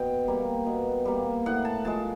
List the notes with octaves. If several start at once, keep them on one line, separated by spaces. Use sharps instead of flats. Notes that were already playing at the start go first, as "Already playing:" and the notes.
Already playing: B2 G5
G3 A#3
B2
G3 A#3
A2 F#5
A5
F3 G#3 A5